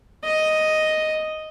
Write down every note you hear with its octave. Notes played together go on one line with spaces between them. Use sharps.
D#5